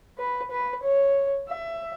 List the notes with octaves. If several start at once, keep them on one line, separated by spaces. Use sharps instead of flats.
B4
B4
C#5
E5